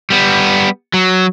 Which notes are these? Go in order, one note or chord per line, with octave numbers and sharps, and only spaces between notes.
G3 B3
F#3